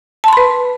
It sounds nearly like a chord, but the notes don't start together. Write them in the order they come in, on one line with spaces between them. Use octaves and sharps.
A5 C6 B5 B4